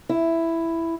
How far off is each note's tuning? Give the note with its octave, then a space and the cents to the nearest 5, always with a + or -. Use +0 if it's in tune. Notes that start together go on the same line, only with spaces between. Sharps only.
E4 +5